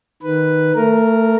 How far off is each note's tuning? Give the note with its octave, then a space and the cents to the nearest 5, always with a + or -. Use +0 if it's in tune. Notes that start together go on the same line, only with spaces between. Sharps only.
D#3 +0 B4 +0
A3 +25 A#4 +0